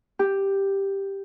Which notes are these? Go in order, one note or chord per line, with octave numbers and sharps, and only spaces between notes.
G4